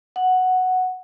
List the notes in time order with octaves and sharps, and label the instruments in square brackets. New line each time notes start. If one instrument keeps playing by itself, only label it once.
[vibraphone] F#5